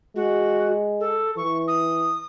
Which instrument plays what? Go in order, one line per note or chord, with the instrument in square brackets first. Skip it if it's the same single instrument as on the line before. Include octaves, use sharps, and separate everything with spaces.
[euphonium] G#3 [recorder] F#4
[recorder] A4
[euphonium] E3 [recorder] C#6
[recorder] D#6